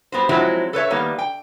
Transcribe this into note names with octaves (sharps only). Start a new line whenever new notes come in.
G3 B3 F#4 C5
F3 F#3 G#3 C4 E4 F#4
A4 B4 C#5 E5
D#3 G3 A#3 B3
G5